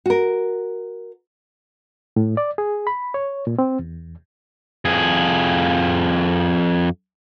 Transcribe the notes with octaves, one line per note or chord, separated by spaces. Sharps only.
F#4 A#4
A2
D5
G#4
B5
C#5
A#2
C4
E2
F2 G#4